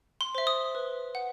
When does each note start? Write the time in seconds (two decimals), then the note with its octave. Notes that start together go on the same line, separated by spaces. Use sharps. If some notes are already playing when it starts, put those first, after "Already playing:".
0.21 C6
0.35 C5 E5
0.47 D#6
0.75 B4
1.15 F#5